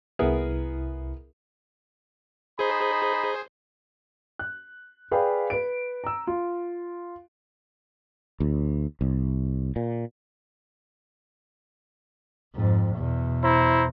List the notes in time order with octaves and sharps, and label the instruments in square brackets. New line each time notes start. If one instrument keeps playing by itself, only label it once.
[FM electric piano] C2 E4 [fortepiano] B3 G#4 A#4
[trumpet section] D#4 B5 [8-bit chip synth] G#4 C5
[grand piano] F#6
G#4 B4 D5 F5 G5 B5
B4 D7
A#5 E6
F4
[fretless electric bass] D2
C2
A#2
[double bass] F2 G#2
E2 B2
[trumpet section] E4 C5 A#5